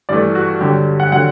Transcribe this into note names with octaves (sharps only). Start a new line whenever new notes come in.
G2 E3 A3 D5
F#4
G2 D3 F#3 G4
F#5
D3 F#3 F#5